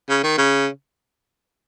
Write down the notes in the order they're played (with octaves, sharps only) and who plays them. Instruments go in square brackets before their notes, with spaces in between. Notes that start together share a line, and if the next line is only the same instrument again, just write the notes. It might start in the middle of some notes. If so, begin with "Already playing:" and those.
[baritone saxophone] C#3
D#3
C#3